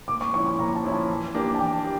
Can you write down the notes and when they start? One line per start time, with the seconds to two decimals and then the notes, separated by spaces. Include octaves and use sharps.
0.08 A#2 D6
0.21 C#6
0.33 F3 C#4 E4 C#6
0.46 C#6
0.59 A#2 A#5
0.75 A5
0.84 F3 C#4 E4
0.92 A5
1.09 E3
1.34 A#3 D4 G4
1.55 A5
1.59 E3 G5
1.84 G4